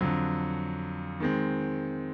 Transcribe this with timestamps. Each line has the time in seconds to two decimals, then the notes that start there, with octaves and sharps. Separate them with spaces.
0.01 F2 D3 F#3
1.20 D#3 G#3 C4